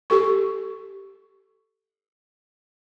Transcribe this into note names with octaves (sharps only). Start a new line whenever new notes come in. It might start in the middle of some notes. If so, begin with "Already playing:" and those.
G4 A4 C#6